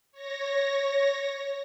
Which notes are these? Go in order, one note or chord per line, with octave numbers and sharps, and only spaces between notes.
C#5 A#6